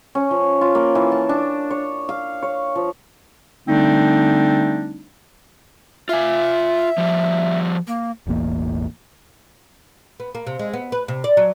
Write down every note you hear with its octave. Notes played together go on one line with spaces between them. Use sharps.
C#4
F3
F4
A#3
E3
A5
D4
C#5
F5
C#5
F3
D3 G3 A3 C4 D4 D#4
F4 E5 G#5
F3 G3
A#3
E1 A1 E2 A#3
B3
A#3
C3
G#3
B3
B4
C3
D5
F#3